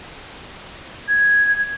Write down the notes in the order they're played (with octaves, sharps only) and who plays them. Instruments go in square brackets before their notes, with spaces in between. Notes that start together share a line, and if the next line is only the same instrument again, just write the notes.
[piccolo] G#6